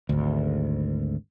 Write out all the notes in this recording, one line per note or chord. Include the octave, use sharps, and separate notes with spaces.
G#1 D2